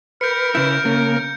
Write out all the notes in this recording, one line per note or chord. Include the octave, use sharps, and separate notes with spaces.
A#4 B4 G6 C#7
C#3 E4 G6
C#3 A#3